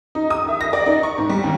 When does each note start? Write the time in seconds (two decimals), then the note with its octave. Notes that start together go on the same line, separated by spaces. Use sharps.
0.15 D#4
0.30 D#6
0.48 E5
0.61 A#6
0.73 D5
0.86 D#4
1.03 C#6
1.18 G#2
1.30 G3
1.43 D#2